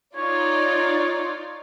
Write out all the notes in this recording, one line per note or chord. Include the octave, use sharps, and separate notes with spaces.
D#4 F4 C#5 D5